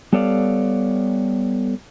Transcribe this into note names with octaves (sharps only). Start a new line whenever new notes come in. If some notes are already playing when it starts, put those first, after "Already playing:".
G3 B3 A4 C#5 D5 F5